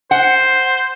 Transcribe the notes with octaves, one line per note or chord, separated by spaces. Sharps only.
C5 F#5